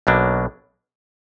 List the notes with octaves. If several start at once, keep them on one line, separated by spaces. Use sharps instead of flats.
B1 B2 F#3 A#3 D4